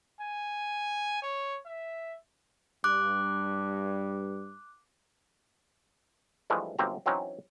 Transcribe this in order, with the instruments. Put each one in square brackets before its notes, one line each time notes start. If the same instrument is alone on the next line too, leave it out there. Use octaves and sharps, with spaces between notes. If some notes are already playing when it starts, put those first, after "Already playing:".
[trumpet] G#5
C#5
E5
[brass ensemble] G2 [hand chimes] D6 F#6
[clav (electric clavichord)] G2 E3 F3 G#3 A3
G1 F#2 A#3 C4 G4 A#5
E3 F#3 C4 C#4 D#4